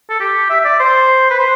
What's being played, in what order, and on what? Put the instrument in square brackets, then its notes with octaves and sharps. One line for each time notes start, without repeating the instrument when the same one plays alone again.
[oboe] A4
G4
E5
E5
D5
C5
B4
C5